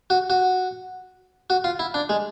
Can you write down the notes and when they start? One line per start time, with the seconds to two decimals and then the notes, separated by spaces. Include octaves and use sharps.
0.10 F#4
0.30 F#4
1.50 F#4
1.64 F4
1.79 E4
1.94 D4
2.09 G#3